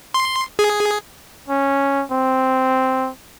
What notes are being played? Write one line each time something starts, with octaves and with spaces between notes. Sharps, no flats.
C6
G#4
C#4
C4